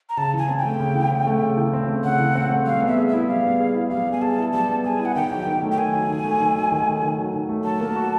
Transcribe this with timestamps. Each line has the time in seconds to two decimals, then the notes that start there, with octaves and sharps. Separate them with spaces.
0.09 A#5
0.17 C#3 A5
0.34 E3 G#5
0.49 C4
0.59 G5
0.65 A3
0.80 C#3
0.95 E3
1.11 C4
1.27 A3
1.42 C#3
1.57 E3
1.73 C4
1.88 A3
2.04 C#3 F#5
2.20 E3
2.35 C4
2.51 A3
2.66 G3 F5
2.82 B3
2.88 E5
2.98 G#4
3.08 E5
3.13 E4
3.28 G3 F5
3.44 B3
3.60 G#4
3.75 E4
3.91 G3 F5
4.07 B3
4.12 G#5
4.22 G#4 A5
4.38 E4
4.53 G3 A5
4.69 B3
4.84 G#4 G#5
5.00 E4
5.05 F#5
5.15 D#3 G5
5.32 F#3
5.47 D#3
5.63 A3
5.72 G5
5.78 D#3 G#5
5.94 F#3
6.09 D#3
6.24 A3
6.40 D#3
6.55 F#3
6.72 D#3
6.87 A3
7.02 D#3
7.18 F#3
7.34 D#3
7.49 A3
7.64 F#3 A5
7.81 A#3
7.96 F#4